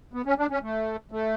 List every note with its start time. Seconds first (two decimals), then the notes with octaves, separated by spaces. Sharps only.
0.13 B3
0.26 C#4
0.38 D4
0.50 C#4
0.62 A3
1.11 A3